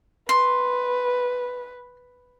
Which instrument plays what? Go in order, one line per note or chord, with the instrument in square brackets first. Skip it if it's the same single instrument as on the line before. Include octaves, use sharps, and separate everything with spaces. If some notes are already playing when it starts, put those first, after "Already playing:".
[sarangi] B4 [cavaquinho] C6